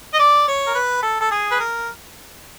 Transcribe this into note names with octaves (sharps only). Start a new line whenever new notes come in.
D#5
D5
C#5
A#4
B4
A4
A4
G#4
B4
A#4